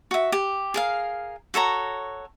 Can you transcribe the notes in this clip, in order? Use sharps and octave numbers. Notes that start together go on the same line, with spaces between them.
F#4 E5
G4
G#4 A#4 F5
F#4 A4 C#5 A#5